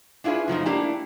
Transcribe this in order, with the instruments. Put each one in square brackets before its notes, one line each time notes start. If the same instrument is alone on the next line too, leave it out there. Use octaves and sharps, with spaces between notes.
[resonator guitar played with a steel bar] D4 E4 F4 G#4 B4
F#2 F3 A3 D#4
A3 A#3 D4 E4 G4